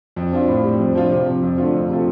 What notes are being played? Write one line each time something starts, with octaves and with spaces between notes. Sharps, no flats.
F2
F3 D4 F4
A2
G3 C4
F2
F3 D4 F4
C3
F3 C4
F2
D3 A3 D4 F4
F2
C3 A3 F4